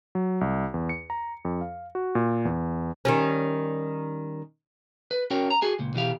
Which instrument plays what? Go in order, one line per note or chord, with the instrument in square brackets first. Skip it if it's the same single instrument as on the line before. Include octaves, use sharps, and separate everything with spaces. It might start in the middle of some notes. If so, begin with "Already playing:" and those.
[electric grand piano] F#3
C2
E2
C#7
A#5
F2
F5
F#4
A#2
E2
[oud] D#3 G3 C#4
[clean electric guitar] B4
C#4 F#4 A#4 C#5 G5
A#5
F#4 G#4 G#5
C#2 A#2
B2 E3 G4 F5